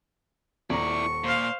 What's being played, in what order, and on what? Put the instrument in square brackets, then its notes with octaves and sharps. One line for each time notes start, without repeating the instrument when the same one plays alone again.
[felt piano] D#1 A#5 [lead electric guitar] E4 D5 [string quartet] C#6
[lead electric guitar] A#2 [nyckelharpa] C5 F5